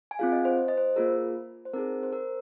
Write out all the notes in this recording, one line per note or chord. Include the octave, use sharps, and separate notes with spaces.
G#5
C4 F4 G#4 F5
D#5
C5
C5
D#5
C5
A#3 F4 G#4 A#4
C5
C4 D#4 G#4 A#4
C5
A#4